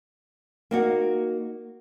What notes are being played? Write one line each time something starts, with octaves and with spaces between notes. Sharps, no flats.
A#3 D#4 F#4